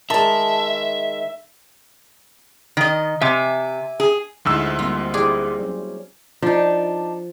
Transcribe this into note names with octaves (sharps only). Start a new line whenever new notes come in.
D#3 G#3 E5 A5
D#3 D#5
C3 E5 G#5 D6
G#4
D2 G#2 F3 E4 E6
G3 A#3 C4 F4
E4 G4 G#4 C5 D5
F#3 C#4
F3 D4 D#4